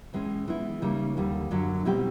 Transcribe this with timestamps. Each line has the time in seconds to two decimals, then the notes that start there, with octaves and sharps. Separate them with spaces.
0.13 A2 E3 G#3 C#4
0.48 E3 G#3 B3 E4
0.82 C#3 E3 G3 A#3 D#4
1.17 D#2 D3 G3
1.51 F#2 D3 F#3
1.85 B2 G3 C4 E4 G4